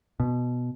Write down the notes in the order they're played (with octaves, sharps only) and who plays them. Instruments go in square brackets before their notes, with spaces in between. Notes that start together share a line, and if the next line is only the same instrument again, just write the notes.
[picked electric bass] B2